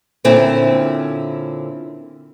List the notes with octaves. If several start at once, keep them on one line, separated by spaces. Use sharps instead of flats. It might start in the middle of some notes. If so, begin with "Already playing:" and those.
A#2 D3 C4 C#4 E4